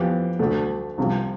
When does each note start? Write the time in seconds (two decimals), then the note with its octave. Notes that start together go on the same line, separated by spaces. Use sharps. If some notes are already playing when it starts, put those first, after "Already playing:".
Already playing: F2 E3 B3 G4
0.39 D2 D3 A3
0.98 C2 C3 F3 C4